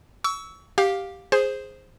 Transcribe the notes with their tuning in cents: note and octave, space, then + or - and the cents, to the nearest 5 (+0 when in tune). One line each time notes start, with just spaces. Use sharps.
C#6 +25 E6 -15
G4 +0 F5 +15
G#4 +0 C5 +5